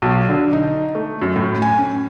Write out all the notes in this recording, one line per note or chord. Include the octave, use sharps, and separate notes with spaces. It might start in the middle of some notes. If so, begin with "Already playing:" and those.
B1
D3
D#4
A3
F#2
A2
G#5
C#4